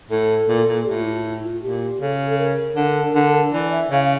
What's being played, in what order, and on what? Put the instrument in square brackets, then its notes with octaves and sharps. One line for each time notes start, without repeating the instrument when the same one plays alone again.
[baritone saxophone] A2 [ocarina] A4
[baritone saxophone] A#2
A#2
[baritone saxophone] A2 [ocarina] G4
[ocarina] F4
E4
F4
E4
F4
[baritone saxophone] A#2 [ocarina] G4
[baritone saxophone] C#3 [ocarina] A4
[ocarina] A4
A#4
[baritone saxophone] D3
D3
[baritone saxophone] E3 [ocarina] D5
[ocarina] E5
[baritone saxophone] C#3 [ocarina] F5